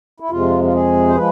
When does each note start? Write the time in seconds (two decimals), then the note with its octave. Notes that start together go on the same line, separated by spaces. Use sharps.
0.20 E4
0.30 F2 C3 G#3 F4
0.64 F4
0.73 G#4
1.08 C5
1.15 F3 G#3 B4